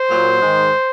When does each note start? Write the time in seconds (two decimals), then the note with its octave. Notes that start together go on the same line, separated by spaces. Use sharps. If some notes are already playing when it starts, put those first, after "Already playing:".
Already playing: C5
0.10 A#2 F#3
0.41 G#2 D#3 G#3